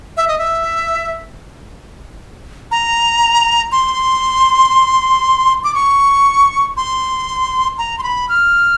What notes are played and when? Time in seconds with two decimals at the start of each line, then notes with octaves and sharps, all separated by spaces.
0.17 E5
0.28 D#5
0.39 E5
2.71 A#5
3.72 C6
5.64 D6
5.75 C#6
6.77 C6
7.78 A#5
7.98 C6
8.03 B5
8.29 F6